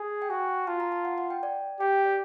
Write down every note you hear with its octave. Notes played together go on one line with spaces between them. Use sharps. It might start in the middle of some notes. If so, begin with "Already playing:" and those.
Already playing: G#4
G5
F#4 G#5
F4 A5
A#5
A5
F#5
F#5
G5
D5
G4 G5
G5
D5